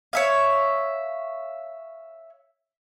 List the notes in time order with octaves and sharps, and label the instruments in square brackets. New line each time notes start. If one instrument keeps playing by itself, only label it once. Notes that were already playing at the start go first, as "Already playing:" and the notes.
[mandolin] C#5 E5 F5